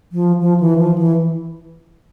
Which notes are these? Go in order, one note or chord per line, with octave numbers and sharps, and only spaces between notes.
F3
F3
E3
F3
E3